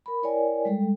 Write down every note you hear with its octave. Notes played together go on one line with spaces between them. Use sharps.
A#4 B5
E4 A#4 C#5 D5 G5 G#5
G3 G#3 A4 G5